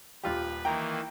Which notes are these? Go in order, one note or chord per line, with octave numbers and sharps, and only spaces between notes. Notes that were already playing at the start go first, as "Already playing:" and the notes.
D#1 F4 G4 B4
D#3 E3 A#3 G5 A#5